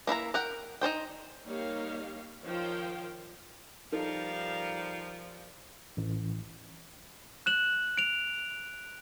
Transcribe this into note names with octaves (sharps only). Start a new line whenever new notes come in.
A#3 E4 E5 A#5
A#4 F#5 G5
D#4 A4 C5 G5
G3 A#3 D#4 G4 C#5 F5
D#3 F3 C5 C#5 F5 G5
F3 G3 D#4 A4 A#4 F5
A1
F#6 E7 F#7
D7 F7